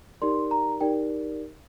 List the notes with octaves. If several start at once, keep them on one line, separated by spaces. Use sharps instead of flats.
D#4 G4 A#4 D5 C6
A#5
D#4 G4 A#4 D5 G5